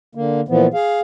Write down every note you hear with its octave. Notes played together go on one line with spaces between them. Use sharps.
D3 A#3
A#2 E3 F3 B3
G#4 F5